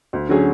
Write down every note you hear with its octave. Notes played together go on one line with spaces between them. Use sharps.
D2
D3 F#3 C#4 G#4